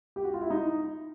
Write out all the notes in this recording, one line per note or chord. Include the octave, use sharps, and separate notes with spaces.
G4
F#4
F4
E4
D#4